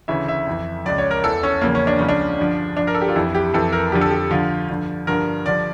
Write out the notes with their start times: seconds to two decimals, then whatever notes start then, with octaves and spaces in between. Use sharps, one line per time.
0.08 D2 C#3 E3 E5
0.28 E5
0.47 F2 E3
0.85 C#2 C#3 F3 D5
0.98 C#5
1.11 A#4
1.24 E2 E3 A4
1.43 C#4
1.61 E2 C#3 F3 A#3
1.75 C#4
1.87 D4
1.99 C#2 C#3 F3 C#4
2.09 D4
2.39 G2 D3 F3
2.77 G2 F3 D4
2.87 A#4
2.95 A4
3.01 G4
3.08 F4
3.16 F2 E3 E4
3.35 G4
3.54 F2 E3 A4
3.72 A#4
3.92 F2 D3 F3 G4
4.01 A4
4.11 G4
4.31 D2 D3 F3 F4
4.69 G2 D3 F3
5.07 G2 D3 F3 A#4
5.46 G2 D3 F3 D5